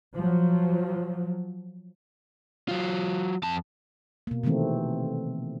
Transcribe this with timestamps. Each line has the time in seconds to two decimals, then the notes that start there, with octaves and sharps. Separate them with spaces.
0.15 F3 F#3
2.68 F#3 F4
3.43 F2 A5
4.27 B2 A#3
4.44 C3 D#3 E3 A3 C4